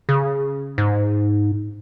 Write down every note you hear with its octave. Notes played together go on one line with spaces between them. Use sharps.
C#3
G#2